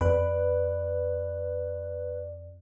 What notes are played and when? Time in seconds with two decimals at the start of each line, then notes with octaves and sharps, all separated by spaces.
0.01 F2 B4 D5 F#6